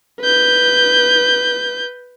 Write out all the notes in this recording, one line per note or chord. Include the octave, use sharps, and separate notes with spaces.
B4 G6